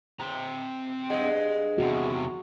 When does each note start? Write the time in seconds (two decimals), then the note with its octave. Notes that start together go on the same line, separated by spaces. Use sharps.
0.20 C4 A#5
1.10 G2 G#3 G#4 D#5 F#5
1.78 E2 C3 F#4